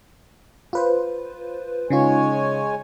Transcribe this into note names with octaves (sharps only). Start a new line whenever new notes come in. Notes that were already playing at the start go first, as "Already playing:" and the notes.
F4 B4 C5
C#3 G#3 D#4 F4 C#5 G#5